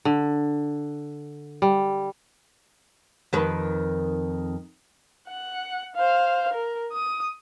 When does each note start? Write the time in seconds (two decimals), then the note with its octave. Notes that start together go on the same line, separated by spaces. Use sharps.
0.05 D3
1.62 G3
3.33 F2 D#3 B4
5.28 F#5
5.95 C5 F5
6.53 A#4
6.92 D#6